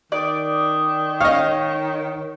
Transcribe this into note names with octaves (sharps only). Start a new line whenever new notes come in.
D#3 D5
C#5 D#5 F5